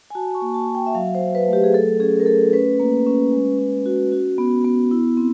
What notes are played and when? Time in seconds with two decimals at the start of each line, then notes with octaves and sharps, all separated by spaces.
0.10 G#5
0.15 F#4 A5
0.35 C#6
0.42 A#3
0.54 A5
0.68 F#4
0.75 G5
0.86 E5
0.95 F#3 F5
1.15 C5
1.21 F#3
1.35 B4
1.48 A3
1.53 G4
1.64 G#4
1.73 A3 A4
2.00 C#4 G#4
2.20 A#4
2.26 A3 A4
2.53 C#4 B4
2.80 A#3
3.06 C#4
3.32 G#3
3.59 C#4
3.86 F#4
4.12 F#4
4.38 B3
4.64 B3
4.91 E4
5.17 C4